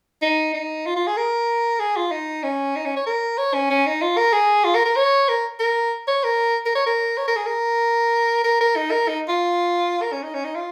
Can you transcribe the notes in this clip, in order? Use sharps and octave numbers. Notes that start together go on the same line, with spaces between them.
D#4
D#4
F4
F4
G#4
A#4
G#4
F4
D#4
C#4
D#4
C#4
C#5
A#4
C#5
C#4
C#4
D#4
F4
A#4
G#4
F4
A#4
A#4
C#5
A#4
A#4
C#5
A#4
A#4
C#5
A#4
C#5
A#4
G#4
A#4
A#4
A#4
D#4
A#4
D#4
F4
A#4
C#4
D#4
C#4
D#4
F4